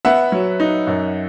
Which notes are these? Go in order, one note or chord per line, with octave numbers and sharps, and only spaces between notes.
B3 E5 F#5
F#3
D#4
F#2